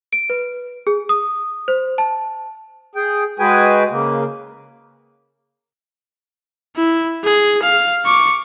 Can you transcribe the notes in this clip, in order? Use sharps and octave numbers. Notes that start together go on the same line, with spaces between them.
D7
B4
G#4
D#6
C5
A5
G#4 G5
G#3 F#4 G#4 B4 G5 G#5
C#3 A#3
E4
G#4
F5
C#6 D6